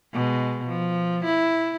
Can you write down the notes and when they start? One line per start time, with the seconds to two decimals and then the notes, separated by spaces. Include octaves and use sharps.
0.13 B2 G#3
0.67 F3
1.24 E4